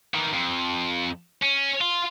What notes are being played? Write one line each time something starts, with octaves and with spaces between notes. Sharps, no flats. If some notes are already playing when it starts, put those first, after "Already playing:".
D#3 E3
F2
C#4
F4